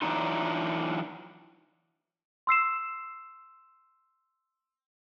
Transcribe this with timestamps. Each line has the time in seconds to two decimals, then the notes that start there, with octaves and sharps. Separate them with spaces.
0.02 E3 F#3 G#3 D4 D#4 F4
2.47 C6 E6 C7 E7